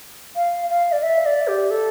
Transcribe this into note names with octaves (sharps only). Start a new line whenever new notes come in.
F5
F5
D5
E5
D5
G4
A4